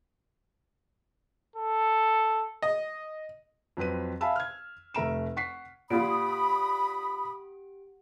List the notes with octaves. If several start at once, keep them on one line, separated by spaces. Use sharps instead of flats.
A4
D#5
F2 F#3 C4 B4 D#7
E5 F5 G#5 A5 B5 E6
F6 G#6
F1 A3 E5 A#5 D7 E7
F#5 C#6 B6 C7
A#2 F4 G4 F#5 B5 D#6 D7